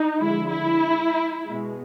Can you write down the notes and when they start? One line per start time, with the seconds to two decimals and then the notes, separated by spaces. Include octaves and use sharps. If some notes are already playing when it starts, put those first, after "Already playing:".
Already playing: D#4
0.20 D3 F3 G#3 E4
0.51 E4
1.46 B2 G#3